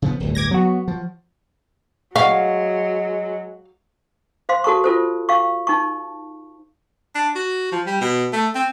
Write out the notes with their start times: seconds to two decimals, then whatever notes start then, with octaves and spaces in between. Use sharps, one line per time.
0.02 C#3 F3 B3
0.20 D1 G1 D2
0.35 D6 G#6 A#6
0.51 F#3 B3 F#4
0.88 F3
2.16 F#3 G#3 F5 F#5 C#6
4.49 C5 F5 C6
4.64 F#4 A4 A5 C#6
4.84 F4 A4 C5
5.29 F5 C#6
5.67 D#4 A5 C#6
7.15 D4
7.36 F#4
7.72 F3
7.86 G3
8.01 B2
8.33 A3
8.55 C4